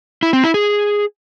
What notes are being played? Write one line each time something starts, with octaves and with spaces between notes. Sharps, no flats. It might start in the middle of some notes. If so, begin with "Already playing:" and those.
E4
C4
E4
G#4